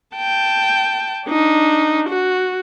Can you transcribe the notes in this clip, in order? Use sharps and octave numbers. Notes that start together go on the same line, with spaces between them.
G5 A5
D4 D#4
F#4